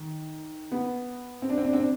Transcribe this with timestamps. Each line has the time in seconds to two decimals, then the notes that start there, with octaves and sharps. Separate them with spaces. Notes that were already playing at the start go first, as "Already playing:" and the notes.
Already playing: D#3
0.72 B3
1.42 C4
1.49 D4
1.58 C4
1.65 D4
1.73 C4
1.80 D4